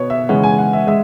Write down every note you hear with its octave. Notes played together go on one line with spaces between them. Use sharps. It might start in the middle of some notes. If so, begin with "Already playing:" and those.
Already playing: B2 B3 C#5
E5
C#3 E3 G#3 C#4 F#5
G#5
F#5
E5
G#3 E5